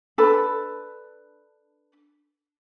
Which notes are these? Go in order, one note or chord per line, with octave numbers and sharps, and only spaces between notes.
D4 A4 B4 B5